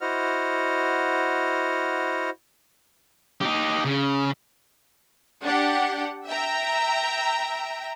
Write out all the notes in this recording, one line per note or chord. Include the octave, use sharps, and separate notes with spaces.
E4 F#4 C5 D#5 F#5 F6
D#4 G4
C#3
D4 G4 F#5
E5 G5 A#5